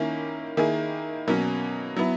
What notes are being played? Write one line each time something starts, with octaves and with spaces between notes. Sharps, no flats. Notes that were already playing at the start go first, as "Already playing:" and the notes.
Already playing: D#3 A#3 C#4 E4
D#3 A#3 E4 G#4
B2 F#3 A#3 C#4
F#3 B3 E4